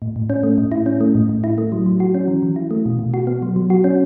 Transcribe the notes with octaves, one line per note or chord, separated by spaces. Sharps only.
A2
A2
C#4
A3
A2
E4
C#4
A3
A2
A2
E4
A3
F#3
F#3
F#4
C#4
E3
E3
E4
A3
B2
B2
F#4
B3
F#3
F#3
F#4
C#4